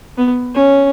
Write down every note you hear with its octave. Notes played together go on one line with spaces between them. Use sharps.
B3
C#4